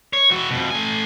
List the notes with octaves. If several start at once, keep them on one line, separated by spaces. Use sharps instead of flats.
C#5
E3 F#4
F2 B2
A3 G#5